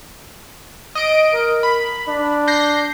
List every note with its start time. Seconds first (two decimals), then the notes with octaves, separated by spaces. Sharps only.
0.95 D#5 D7
1.34 A#4
1.63 B5
2.08 D4
2.48 G6 A#6 C7